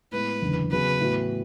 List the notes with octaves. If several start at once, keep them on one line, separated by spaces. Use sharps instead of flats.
A2 G#3 B3 E4 B4
F#1 E2 D3
C#3 F#3 B3 B4
A2 E3 B3 F#4